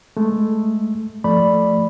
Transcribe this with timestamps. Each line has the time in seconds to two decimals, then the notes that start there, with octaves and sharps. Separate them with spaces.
0.17 G#3 A3
1.24 F3 A3 D5 B5